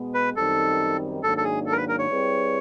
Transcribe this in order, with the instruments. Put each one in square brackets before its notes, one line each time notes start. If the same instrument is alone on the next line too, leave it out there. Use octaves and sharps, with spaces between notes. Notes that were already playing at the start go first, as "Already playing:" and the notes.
Already playing: [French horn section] B2 G#3 B3
[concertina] B4
[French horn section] F#2 D#3 G3 C4 D#4 [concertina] A4
[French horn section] G#2 D#3 F#3 A#3 D4 [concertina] A4
[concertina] A4
G#4
A4
A#4
B4
A#4
C#5
[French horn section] G3 C4 E4 G#4 B4